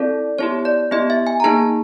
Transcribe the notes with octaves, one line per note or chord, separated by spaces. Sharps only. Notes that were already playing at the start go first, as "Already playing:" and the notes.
Already playing: C4 E4 A4 D5
B3 E4 G4 C#5
D5
B3 E4 G4 D#5
E5
G#5
A#5
A#3 D#4 G#4 A5